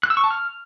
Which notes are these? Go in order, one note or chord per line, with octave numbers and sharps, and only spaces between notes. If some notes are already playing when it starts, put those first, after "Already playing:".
F#6
E6
C#6
A5
F6